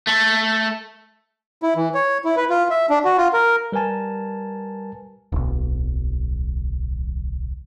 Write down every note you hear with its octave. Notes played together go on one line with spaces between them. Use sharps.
A3
E4
E3
C#5
E4
B4
F4
E5
D4
F#4
F4
A#4
G3 A#4 B4 G#5 A5
D1 B1